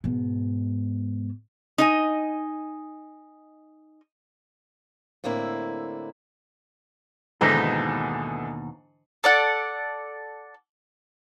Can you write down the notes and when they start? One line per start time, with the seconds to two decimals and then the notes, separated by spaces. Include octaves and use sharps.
0.04 G#2 B2
1.78 D#4 D#5 G#5
5.24 A2 D3 A#3 C4 E4
7.41 D#2 G#2 B2 D3 E3 D#4
9.24 A4 D5 F#5